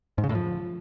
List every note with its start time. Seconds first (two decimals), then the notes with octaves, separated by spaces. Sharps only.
0.18 G#2
0.24 C#3
0.29 A2
0.35 F3